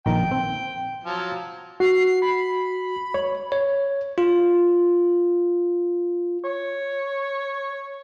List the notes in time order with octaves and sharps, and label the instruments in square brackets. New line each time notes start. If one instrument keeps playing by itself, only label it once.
[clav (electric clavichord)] A#1 D#3 A#5 [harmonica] G5
[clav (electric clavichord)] C4
[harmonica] F3 F#3
[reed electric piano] F#4 [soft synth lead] C7
[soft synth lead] B5
[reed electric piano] C#5
[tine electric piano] C#5
F4
[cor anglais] C#5